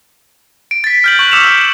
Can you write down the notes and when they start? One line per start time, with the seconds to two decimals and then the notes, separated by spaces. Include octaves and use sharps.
0.71 D7
0.84 A6 B6
1.04 F6 G6 F#7
1.19 C#6 F#6
1.31 D6 E6 C#7 E7 F7